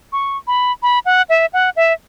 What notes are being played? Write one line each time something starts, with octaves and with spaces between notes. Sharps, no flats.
C#6
B5
B5
F#5
E5
F#5
E5